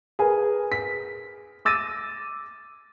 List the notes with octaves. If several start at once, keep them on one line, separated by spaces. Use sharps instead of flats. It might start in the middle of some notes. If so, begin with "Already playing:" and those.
G#4 A#4 B4 G#5
B6
D6 E6 A6 A#6 D#7